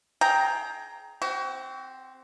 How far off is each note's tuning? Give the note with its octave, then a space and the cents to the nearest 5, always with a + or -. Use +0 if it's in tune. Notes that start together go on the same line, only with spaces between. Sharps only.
G#4 +25 G5 +0 A#5 +0
C4 +0 F#4 +35